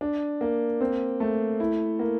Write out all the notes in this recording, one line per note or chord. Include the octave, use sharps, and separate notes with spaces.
D4
A#3
C4
A3
E4
A#3